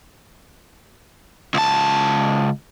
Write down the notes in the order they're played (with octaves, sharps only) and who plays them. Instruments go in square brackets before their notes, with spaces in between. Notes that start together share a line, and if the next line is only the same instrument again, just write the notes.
[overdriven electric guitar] C#2 A5